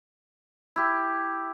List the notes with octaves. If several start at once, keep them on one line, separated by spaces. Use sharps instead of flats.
E4 G4